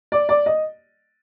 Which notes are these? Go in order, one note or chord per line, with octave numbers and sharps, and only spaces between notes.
D5
D5
D#5